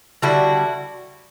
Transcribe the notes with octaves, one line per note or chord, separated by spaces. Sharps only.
D3 G3 E4 F#4